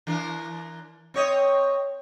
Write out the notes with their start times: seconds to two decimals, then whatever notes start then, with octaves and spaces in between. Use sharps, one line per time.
0.07 E3 D4 A#4
1.14 C4 C#5 D#5